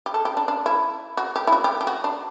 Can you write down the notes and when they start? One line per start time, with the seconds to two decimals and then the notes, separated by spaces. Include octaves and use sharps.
0.06 G4
0.14 A4
0.25 G4
0.37 D4
0.48 D4
0.66 E4
1.17 F#4
1.36 G4
1.47 E4
1.52 F#4
1.64 G4
1.81 G4
1.87 F#4
2.04 D4